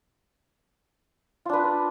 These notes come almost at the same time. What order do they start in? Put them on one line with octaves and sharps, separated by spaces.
F4 D4 B4